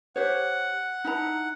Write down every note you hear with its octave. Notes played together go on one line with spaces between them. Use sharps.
G4 C5 C#5 F#5
D#4 E4 A#5